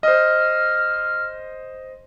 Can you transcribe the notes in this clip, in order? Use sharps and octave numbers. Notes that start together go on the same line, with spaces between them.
C5 D#5 F6